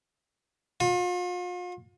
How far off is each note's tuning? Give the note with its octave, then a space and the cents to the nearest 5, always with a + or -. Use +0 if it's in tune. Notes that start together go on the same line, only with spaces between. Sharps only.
F4 +40